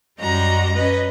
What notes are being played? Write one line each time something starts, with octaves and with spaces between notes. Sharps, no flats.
F#2 G3 F#4 D#5 A#5
C#4 B4 D#5